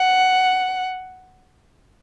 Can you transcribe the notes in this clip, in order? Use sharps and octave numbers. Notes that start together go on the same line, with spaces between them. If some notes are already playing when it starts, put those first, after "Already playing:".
Already playing: F#5